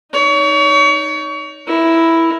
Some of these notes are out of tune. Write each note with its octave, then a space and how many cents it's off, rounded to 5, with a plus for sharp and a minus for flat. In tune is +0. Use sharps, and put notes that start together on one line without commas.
D#4 +0 C#5 +35
E4 +0 A#4 +15